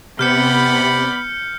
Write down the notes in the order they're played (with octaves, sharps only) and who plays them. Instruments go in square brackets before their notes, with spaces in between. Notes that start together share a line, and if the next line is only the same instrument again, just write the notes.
[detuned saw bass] C3 [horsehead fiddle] B3 [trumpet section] D5 F#5 B5 [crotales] F6 G6 C#7